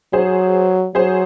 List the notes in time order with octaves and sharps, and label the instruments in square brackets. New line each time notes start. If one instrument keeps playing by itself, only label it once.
[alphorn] F#3 [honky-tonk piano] G#4 C5
[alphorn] F#3 [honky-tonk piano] G#4 C5